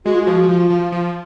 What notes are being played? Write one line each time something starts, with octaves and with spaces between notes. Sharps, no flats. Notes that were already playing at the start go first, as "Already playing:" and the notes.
G#3 F#4
F4
F3 F#4
F3 F4
F3
F3